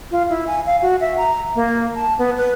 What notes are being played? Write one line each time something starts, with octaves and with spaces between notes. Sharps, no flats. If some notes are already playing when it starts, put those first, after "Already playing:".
F4
E4
G#5
F5
F#4
E5
A#5
A#3
A5
B3
B4